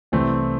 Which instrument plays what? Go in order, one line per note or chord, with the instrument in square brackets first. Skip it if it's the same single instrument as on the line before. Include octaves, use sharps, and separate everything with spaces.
[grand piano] C2 C3 E3 A3 C4